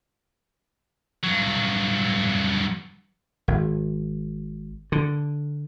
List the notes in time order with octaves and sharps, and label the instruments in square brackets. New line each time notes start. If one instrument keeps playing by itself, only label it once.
[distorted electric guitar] G2 F#3
[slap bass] G#1
D3